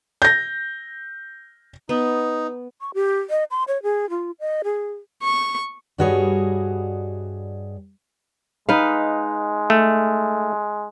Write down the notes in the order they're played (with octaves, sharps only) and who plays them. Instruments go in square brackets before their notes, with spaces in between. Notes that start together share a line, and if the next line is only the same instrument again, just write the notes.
[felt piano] G6 A#6
[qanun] B3 [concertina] D#4
[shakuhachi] C#6
G4
D#5
C6
C#5
G#4
F4
D#5
G#4
[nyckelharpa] C#6
[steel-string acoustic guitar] G2 G3 F#4 G#4 C#5 D#5
[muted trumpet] G#3 [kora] D#4 B4 F5
[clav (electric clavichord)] A3